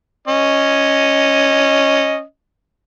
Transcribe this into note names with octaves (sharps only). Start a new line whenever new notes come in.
C#4 D#5